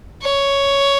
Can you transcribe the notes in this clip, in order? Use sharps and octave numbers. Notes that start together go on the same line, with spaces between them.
C#5